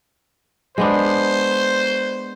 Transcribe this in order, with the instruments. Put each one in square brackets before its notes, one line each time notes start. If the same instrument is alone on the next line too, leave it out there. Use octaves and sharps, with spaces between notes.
[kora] G#3 B3 D4 [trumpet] C5